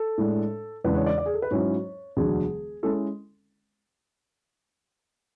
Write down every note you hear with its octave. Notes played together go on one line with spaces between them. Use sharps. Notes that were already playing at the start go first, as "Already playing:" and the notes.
Already playing: A4
A2 G#3 D4
E2 C#3 G#3 D4 B4
C#5
D5
D5
G#4
A4
B4
G#2 F#3 C#4 E4 C#5
E1 D2 D3 F#3 G#4
G#3 C#4 E4 A4